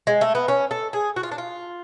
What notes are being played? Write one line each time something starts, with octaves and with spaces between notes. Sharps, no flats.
G#3
A3
B3
C#4
A4
G#4
F#4
F4
D4
F4